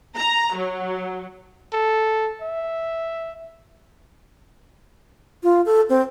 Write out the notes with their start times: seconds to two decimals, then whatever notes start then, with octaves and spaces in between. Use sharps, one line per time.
0.17 A#5
0.56 F#3
1.73 A4
2.42 E5
5.43 F4
5.66 A4
5.89 C4